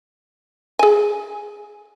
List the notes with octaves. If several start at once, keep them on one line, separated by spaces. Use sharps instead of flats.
G#4 G#5